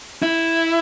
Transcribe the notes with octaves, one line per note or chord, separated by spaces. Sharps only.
E4